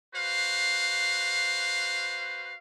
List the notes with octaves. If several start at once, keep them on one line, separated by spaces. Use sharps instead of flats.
F#4 B4 C5 F5